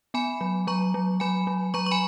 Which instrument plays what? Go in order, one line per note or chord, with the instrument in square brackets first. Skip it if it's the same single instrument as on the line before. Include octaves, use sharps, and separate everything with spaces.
[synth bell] B3 G#5 B5
F#3
F#3 A#5 C#6
F#3
F#3 G#5 B5
F#3
F#3 A#5 C#6
C#6
G#5 B5